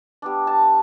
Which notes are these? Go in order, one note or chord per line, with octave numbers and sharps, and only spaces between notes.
G3 B3 D4
A5